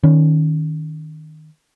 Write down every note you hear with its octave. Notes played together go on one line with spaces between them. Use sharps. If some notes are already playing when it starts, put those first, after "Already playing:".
D#3 C#4